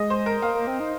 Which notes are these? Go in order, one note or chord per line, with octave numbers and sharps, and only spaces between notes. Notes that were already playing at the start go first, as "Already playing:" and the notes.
Already playing: G#3 D#5
C5
A#4
A#3 F5
A#3
C4
D#4